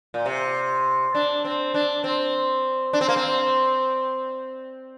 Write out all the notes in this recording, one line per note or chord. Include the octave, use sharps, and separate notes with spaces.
A#2
C3
D4
C4
D4
C4
D4
C4
A#3
C4